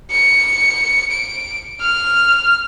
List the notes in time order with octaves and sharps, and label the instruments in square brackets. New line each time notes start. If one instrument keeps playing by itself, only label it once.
[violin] C#7
D7
F6